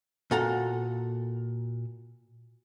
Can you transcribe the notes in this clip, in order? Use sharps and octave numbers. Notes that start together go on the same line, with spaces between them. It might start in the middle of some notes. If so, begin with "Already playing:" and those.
A#2 F#4 A4 F#5 A#5